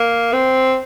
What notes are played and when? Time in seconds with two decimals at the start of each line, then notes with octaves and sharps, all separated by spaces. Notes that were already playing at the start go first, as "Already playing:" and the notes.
Already playing: A#3
0.33 C4